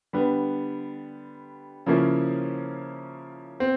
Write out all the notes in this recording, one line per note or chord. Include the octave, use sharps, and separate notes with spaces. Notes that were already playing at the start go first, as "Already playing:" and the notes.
D3 G3 B3
C#3 F3 A#3 C#4 E4
C4